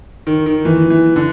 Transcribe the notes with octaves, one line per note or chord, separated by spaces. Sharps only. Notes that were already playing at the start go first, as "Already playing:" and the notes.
D#3
D#3
E3
E3
D3